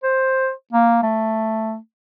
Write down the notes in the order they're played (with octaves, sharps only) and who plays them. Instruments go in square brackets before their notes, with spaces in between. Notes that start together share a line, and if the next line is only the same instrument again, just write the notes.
[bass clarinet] C5
A#3
A3